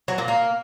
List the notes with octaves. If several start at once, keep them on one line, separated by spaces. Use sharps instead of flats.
F#3
A#2
A#3